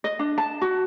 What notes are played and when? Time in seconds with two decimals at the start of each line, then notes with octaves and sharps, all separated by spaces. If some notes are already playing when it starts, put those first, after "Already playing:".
0.04 D#5
0.19 D4
0.38 A5
0.61 F#4